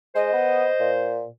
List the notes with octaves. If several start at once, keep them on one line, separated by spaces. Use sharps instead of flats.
G#3 C5 D#5
B3
A#2